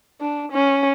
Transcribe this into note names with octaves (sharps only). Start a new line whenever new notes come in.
D4
C#4